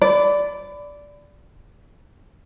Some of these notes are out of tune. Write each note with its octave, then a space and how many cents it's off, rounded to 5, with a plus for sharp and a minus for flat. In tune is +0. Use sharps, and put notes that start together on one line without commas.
D5 -10 B5 +25